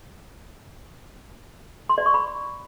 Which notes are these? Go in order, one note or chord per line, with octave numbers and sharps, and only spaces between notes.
C6
D5
C#6
B5